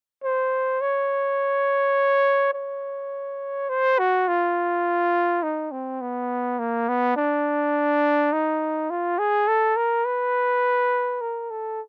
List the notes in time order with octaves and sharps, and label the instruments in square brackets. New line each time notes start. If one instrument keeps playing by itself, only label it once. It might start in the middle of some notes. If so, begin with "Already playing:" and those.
[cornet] C5
C#5
C#5
C5
F#4
F4
D#4
C4
B3
A#3
B3
D4
D#4
F4
G#4
A4
A#4
B4
A#4
A4